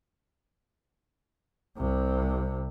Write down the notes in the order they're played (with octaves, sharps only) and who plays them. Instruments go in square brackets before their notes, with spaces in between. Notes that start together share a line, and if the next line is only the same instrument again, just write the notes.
[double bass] C2 C3